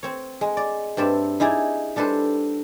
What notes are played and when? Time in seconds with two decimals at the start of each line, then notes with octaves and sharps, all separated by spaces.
0.03 C4 C#5
0.41 G#3
0.57 D5
0.97 G2 C4 D5 E5
1.40 D#4 E4 G#4 D5
1.96 G3 D4 A4 B4 C5